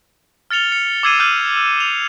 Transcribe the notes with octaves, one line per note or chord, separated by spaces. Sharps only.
F6 A6 C#7 F7 G7
C#7
D6 E6 G#6 C7 D#7 E7
D6 F6 G6 D#7
E6
F7 G7